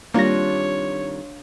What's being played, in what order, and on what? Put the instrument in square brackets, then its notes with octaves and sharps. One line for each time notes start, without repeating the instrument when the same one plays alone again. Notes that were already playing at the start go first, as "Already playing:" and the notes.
[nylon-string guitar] D#3 G3 C4 [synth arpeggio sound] A#3 A#6 [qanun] D4 F4 [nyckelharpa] C#5